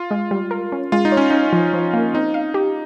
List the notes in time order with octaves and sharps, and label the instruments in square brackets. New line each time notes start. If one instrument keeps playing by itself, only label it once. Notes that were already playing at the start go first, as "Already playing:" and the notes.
Already playing: [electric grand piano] F4
[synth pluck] G#3
G3
A#4
C#4
[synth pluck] G#3 [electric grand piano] F4
[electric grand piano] D#4
[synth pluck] C#5
[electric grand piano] C#4
[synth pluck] C#4 [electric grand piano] D#4
[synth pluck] F3
F3
A#3
[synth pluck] C4 [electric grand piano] D#4
[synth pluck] F5
G4